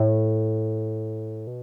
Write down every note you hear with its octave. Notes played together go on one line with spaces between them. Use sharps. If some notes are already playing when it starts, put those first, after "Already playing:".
Already playing: A2
B2